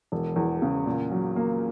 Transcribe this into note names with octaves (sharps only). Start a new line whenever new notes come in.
E1
E2
C#3
A#2
F#3
A#3